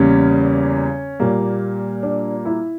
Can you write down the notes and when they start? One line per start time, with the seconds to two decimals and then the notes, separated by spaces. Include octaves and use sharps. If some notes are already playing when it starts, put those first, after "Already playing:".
Already playing: E2 C#3 G3 A#3 C#4
1.20 A#2 G3 A#3
2.03 D4
2.45 E4